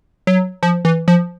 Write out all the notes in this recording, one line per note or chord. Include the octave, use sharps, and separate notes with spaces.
F#3
F3
E3
F3